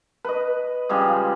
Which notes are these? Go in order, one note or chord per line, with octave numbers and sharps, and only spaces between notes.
B4 D#5
C#3 F3 G3 G#3